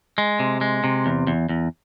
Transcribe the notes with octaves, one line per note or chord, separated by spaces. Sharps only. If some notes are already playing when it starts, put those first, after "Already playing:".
G#3
C3
G#3
C3
E2
E2
E2